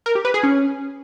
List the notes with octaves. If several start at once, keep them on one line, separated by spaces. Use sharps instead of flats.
A#4
G4
B4
G#4
C#4